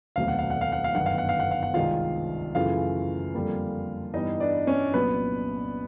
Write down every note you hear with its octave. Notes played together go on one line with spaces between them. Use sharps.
E1 D2 C3 D#3 F#3 F5
F#5
F5
F#5
F5
F#5
F5
G1 F#2 D#3 F#5
F5
F#5
F5
F#5
F5
F#5
C2 C3 D#3 G#3 F4 F5
F#2 C#3 E3 A3 F4 F5
F2 D3 G3 A#3
G2 E3 G3 B3 D#4 D#5
D4 D5
C#4 C#5
C2 A#2 F#3 B3 B4